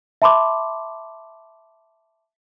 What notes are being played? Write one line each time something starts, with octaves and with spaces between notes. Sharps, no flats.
E5 A5 B5 C6 D6